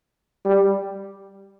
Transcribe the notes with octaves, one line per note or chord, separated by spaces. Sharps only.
G3